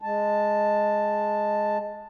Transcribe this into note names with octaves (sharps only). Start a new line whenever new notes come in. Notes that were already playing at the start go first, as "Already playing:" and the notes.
G#3 A5